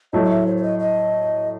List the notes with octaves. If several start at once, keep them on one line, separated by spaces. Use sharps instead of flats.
A2 F#3 A3 D#5
D#5
E5
C5
C5
D#5
D#5